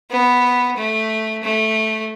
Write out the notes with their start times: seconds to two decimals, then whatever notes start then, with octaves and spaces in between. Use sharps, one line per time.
0.11 B3
0.77 A3
1.43 A3